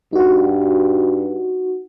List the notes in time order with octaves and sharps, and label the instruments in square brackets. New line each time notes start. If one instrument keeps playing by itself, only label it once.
[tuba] G2 [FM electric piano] D#4 F#4